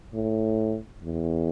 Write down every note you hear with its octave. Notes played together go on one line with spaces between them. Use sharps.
A2
E2